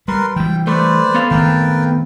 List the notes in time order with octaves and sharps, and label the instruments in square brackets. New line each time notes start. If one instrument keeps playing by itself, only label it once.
[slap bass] G3 [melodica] A#4 B4 C6
[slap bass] E3 G3 [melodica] G5
[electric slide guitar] A3 [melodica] B4 C5 D5
[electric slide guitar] B3 A4 F5
[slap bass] D#3 A3 C4 [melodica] A#4 B4 G5